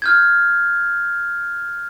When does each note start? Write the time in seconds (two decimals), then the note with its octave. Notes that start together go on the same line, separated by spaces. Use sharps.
0.02 F6 G6 G#6